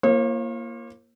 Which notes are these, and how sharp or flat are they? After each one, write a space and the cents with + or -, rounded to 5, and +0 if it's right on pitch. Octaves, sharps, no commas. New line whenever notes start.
A#3 +5 F4 -40 C#5 -45